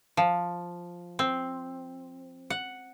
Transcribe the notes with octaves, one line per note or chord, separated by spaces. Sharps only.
F3
C4
F#5